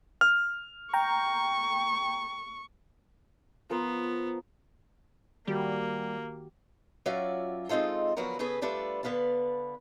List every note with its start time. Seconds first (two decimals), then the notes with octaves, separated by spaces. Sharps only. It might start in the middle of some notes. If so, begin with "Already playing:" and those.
0.21 F6
0.94 G5 A#5 C#6
3.70 F3 B3 A#4 C5
5.47 D#3 G3 A#3 F#4 G4
7.06 F#3 C#4 F4 F#4 D5 E5
7.69 G#3 C4 D#4 F4 A4
8.17 D3 F3 F#3 B3 F#4 A#4
8.39 C#3 B3 G#4 A4 B4 G#5
8.61 G3 A3 D4 F4 A4 B4
9.03 D3 B3 B4 F5 A5